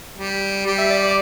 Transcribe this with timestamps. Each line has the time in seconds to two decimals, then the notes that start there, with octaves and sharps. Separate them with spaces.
0.17 G3
0.66 G3
0.78 E5
0.90 D5
1.02 D5